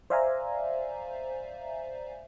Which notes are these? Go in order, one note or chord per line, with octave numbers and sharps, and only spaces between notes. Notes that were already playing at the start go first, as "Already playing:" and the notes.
C5 D5 E5 F5 G#5 A#5